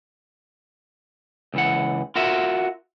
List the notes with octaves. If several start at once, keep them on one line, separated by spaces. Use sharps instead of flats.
C#2 E3 F#5
F4 F#4 A#4 E5